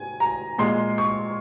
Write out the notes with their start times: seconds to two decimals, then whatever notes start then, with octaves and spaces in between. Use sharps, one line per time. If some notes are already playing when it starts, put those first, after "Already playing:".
Already playing: G#5
0.20 A#5
0.58 A#2 G#3 C6
0.98 C#6